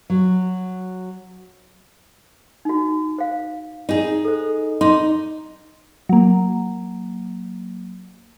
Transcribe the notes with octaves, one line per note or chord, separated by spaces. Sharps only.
F#3
D#4 F#4
C5 F5
D#4 G#4
A4 C5
D#4 C6 D6
F#3 A#3